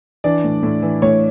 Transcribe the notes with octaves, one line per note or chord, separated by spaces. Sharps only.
E3 D4 D5
A2
A2
E3
A2 C#5